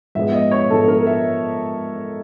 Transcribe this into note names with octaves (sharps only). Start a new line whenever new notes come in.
G#2 F3 G#3 B3 E5
D#5
C#5
G#2 F3 G#3 B3 A4
A#4
E5